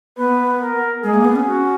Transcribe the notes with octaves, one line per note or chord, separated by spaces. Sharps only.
B3 B4
A#4
G#3 G#4
A#3
B3
C#4
F#4